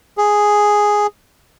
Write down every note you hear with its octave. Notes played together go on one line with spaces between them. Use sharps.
G#4